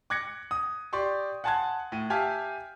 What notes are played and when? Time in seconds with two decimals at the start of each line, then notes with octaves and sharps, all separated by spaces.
0.10 D6 F#6 G#6 A#6 C#7
0.51 D#6
0.93 G4 D5 C6 C#6
1.44 F#5 G#5 A5 C6 F#6 G#6
1.92 A2 D#7
2.10 G4 E5 F5 G#5 A5 F6